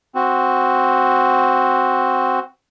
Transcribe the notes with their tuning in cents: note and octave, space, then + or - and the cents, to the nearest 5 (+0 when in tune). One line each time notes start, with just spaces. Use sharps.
C4 +0 F#4 +0